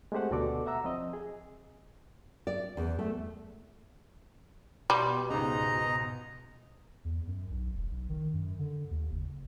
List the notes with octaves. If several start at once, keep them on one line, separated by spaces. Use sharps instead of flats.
G#3 A3 C4 G4 C5 F#5
D2 B2 F#4 A4 D5 D6
E5 F#5 A#5 E6
F3 C4 D#5
G#4
D5
E2
A3
B2 G3 C6
C#2 G#2 B2 D#5 A#5
E2
F#2
B1
E1
B1
D#3
F#2
D3
D#2
F#1